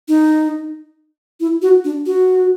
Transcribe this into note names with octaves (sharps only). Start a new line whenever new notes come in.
D#4
E4
F#4
D4
F#4